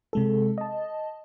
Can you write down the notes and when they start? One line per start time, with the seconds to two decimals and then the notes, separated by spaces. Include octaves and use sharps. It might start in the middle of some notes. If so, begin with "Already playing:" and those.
0.13 C3 G#3 A4
0.58 D#5 A5